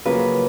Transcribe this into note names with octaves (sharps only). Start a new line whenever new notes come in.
F#2 C#3 F3 A#3 B4